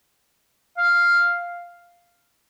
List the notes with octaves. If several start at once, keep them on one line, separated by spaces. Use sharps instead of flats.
F5